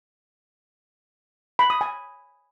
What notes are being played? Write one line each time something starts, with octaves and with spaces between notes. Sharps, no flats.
B5
D#6
G#5